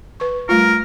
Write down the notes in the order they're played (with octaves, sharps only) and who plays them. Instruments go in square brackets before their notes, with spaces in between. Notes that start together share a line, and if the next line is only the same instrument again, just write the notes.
[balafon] B4 C#6
[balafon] G3 A3 F4 [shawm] A#4